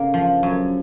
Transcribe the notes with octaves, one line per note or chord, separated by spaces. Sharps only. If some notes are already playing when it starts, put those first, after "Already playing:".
Already playing: C#3 A#3
F3
F#2